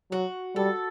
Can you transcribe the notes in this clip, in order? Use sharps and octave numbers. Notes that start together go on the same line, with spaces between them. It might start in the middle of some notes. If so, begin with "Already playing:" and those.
F#3 F#4
G3 A4